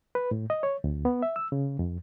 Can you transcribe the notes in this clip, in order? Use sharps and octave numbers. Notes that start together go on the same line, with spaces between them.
B4
A2
D#5
C#5
D2
B3
E5
E6
C#3
F2